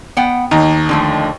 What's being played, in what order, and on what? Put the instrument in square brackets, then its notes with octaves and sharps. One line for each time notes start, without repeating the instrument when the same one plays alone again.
[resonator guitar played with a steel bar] B3 F#5 G5
[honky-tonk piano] D#2 D#4 [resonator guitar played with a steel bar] A#5
[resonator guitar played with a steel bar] D3 F3 A3